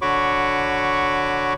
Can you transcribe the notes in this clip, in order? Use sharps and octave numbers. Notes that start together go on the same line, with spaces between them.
D3 F#4 C#5 B5 C#6 D6